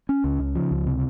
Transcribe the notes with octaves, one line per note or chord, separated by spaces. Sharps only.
C#4
C#2
C#3
F3
C#2
C3